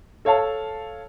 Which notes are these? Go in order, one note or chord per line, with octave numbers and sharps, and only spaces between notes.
A4 C#5 F5 A5